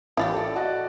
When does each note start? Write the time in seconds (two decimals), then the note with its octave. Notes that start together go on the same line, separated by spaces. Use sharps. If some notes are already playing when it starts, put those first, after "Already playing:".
0.17 A1 E4 F4 G4
0.34 A4 D5
0.56 F#4 D5 D#5